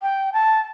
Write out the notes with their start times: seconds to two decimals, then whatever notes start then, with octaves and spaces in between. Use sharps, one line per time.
0.02 G5
0.33 A5